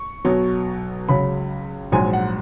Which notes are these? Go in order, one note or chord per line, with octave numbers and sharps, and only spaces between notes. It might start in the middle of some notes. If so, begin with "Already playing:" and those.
Already playing: C#6
B1 B2 F#3
C#2 C#3 F#3 B5
A#1 G#2 F#3 G#5
F#5